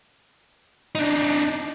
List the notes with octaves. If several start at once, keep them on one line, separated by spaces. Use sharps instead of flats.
D4 D#4